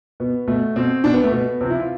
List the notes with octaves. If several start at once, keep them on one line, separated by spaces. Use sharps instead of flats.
B2 B3
B2 A3
B2 C4
B2 D4
B3
A3
B2 B3
C3 F3 C4
E4
F4